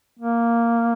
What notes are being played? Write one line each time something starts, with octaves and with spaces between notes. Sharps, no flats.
A#3